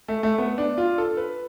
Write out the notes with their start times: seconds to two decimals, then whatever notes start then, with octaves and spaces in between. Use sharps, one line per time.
0.08 A3
0.23 A3
0.38 B3
0.58 D4
0.78 F4
0.98 A4
1.17 B4